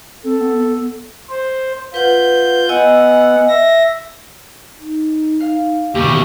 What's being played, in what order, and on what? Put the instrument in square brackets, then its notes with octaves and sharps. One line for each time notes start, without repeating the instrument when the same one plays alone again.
[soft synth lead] C4 [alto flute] A4
[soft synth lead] B3
[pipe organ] C5
[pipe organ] F4 G6 [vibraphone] B4 F#5
[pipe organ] B3 F#5 [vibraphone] D#5 G#5 E6
[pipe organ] E5 A#6
[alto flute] D#4
[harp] F5
[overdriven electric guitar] D#2 B2 [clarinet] G4 [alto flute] C#6